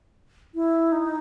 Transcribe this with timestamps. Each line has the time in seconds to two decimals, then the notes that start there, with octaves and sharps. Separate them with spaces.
0.55 E4
0.92 D#4